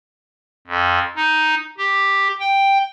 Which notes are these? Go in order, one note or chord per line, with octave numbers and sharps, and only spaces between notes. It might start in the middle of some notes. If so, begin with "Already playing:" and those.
F2
D#4
G4
G5